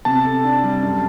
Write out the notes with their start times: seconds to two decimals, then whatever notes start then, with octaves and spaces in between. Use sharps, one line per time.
0.05 C3 A5
0.25 A4
0.44 D4
0.63 G3
0.83 F#2